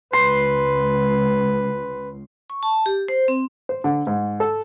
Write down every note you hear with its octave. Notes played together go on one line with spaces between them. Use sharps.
C#2 B4 C6
C#6
A5
G4
C5
C4
C5
D3
G#2
A4